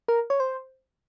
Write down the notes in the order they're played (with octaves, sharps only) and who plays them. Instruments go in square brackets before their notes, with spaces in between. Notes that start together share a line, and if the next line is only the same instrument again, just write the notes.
[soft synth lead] A#4
C#5
C5